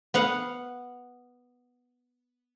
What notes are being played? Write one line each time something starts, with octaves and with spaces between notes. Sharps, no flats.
B3 F5 F#5